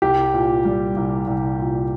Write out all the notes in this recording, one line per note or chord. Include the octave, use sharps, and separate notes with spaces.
C2 G4
A#2
G3
C2
C2
A#2